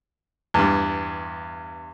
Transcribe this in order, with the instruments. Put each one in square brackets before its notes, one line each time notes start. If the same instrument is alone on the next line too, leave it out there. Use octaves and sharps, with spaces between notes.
[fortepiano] E2 G2